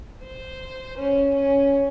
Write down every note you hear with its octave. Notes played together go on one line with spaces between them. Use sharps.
C5
C#4
C#4